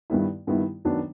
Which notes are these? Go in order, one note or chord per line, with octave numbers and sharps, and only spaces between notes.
G2 D#3 G3 B3 E4
G2 D#3 G3 B3 E4
F#2 D#3 F#3 B3 D4